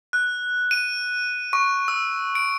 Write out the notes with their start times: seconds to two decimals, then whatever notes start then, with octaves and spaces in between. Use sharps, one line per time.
0.13 F#6
0.71 D#7
1.53 C#6
1.88 E6
2.35 D7